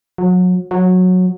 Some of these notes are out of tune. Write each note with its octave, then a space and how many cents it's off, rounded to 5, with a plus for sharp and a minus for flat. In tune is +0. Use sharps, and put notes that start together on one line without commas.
F#3 -30
F#3 -15